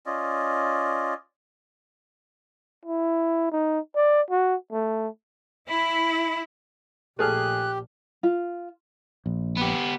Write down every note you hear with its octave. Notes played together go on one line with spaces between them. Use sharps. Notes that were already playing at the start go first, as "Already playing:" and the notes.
C#4 F4 D5 D#5
E4
D#4
D5
F#4
A3
E4 B5
A#1 A3 G4 G#4 F6 F#6
F4
A#1
B3 G4